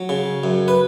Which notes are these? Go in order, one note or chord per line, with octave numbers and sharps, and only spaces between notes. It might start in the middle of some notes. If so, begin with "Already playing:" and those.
Already playing: F#3
C#3
F#2
B4